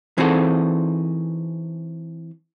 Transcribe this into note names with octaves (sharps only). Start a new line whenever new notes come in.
E3 C4 D#4 F#4 G#4 A4